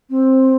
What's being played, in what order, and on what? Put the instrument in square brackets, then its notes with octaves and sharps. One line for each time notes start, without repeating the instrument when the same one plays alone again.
[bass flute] C4